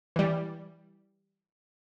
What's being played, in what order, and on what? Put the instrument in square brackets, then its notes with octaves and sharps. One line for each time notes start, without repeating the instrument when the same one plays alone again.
[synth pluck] E3 G3